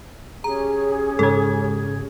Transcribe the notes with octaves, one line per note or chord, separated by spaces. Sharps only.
C#4 G4 G#4 A#5
G#2 C#3 G#3 A4 G#6